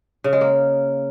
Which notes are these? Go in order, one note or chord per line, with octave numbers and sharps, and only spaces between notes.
C#3
G#3
A#3